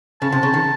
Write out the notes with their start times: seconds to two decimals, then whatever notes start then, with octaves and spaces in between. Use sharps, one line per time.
0.22 C#3 A5
0.32 C3
0.43 C#3
0.54 D#3